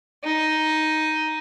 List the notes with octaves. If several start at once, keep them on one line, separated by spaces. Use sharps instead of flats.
D#4